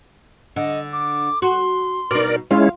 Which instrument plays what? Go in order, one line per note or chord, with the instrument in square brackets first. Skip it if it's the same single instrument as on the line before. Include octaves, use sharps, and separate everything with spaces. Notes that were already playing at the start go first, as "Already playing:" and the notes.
[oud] D3 [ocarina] D#5
[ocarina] D6
[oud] F#4 [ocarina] C6
[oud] B2 D#4 [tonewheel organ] A#4 D5
[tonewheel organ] G#3 C#4 E4 [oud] F4 [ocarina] F5